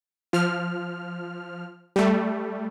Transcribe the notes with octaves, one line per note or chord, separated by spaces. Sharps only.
F3 F6
G3 A3